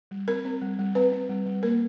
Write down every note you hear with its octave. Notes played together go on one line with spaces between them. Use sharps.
G3
C4 A#4
C4
G3
G3
C4 B4
C4
G3
G3
A#3 A#4